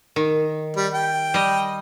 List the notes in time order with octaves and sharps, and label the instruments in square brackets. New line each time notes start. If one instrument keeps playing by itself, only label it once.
[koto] D#3
[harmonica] G3
G5
[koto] G3 D#5